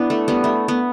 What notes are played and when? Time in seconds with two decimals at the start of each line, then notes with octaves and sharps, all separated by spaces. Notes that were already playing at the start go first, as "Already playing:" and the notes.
Already playing: B3 D4 E4
0.10 A3
0.28 G3 B3
0.44 A3
0.68 B3